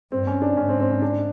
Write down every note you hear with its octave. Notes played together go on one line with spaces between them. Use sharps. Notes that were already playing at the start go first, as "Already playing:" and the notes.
G2 C4
C#4
D4
G#2 C#4
C4
C4
C#4
D4